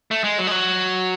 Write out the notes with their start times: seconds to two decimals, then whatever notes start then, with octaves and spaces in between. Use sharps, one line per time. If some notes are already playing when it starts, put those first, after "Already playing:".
0.11 A3
0.24 G#3
0.38 F#3
0.47 G#3
0.51 F#3